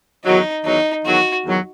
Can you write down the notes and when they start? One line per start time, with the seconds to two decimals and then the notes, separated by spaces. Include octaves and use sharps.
0.25 E2 D#3 F#3 D#4
0.65 E2 D#3 F#3 D#4
1.05 E2 D#3 F#3 F#4
1.46 E2 D#3 F#3